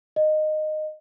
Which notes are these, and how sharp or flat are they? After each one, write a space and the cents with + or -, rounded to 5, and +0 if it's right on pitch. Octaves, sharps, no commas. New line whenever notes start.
D#5 -15